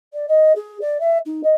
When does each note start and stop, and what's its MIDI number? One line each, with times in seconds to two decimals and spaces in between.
0.13 0.26 74
0.28 0.52 75
0.55 0.80 68
0.81 1.00 74
1.00 1.18 76
1.25 1.41 63
1.43 1.55 75